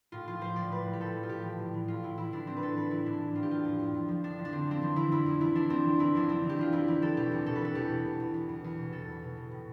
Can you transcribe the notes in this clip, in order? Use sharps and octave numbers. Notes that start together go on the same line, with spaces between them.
A2 F4
F3 F4
F3 C5
A2 D5
F3 B4
A2
G4
A2 A4
F3
F4
A2 G4
E3
A2
E3
A2 F4
A2 E4
E3 E4
E3 D4
E3 C4
B4
A2 A4
E3 B4
E3 E4
A2 D4
E3
A2 F4
G4
E3 F4
F2
F2
F2
F3
F3 D4
F2
D4
D3 C4
F3 C4
E3 D4
E3 E4
F2 E4
F2
E3 E4
E3 D4
F2 C4
E3
E3 E4
F2 D4
E3 C4
E3
G4
E3 F4
F2 E4
E3 G4
E3 A4
B2 G4
E2
B2 A4
B4
E2 A4
E2 G4
B2
E2
E2
E2
E2
E2
B2
B2 A4
E2
B2
B2
A2